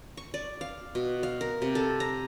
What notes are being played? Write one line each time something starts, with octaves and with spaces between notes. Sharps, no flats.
C#6
D5
F5
B2
F5
A#4
C3
A4
A#5